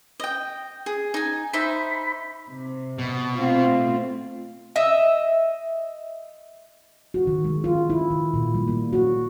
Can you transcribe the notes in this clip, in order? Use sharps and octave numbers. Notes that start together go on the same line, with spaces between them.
D#5 G5
G#4
D#4 G#5
D#4 C5 E5 B5
C3
B2
A3 C4 F4
D#5 E5
F#4
D#3
G#3
F4
E4
D#3
A#2
G3
A#3
F#4